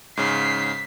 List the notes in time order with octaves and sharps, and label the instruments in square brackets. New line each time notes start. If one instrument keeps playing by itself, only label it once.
[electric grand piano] G#2 C#3 [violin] B6 C7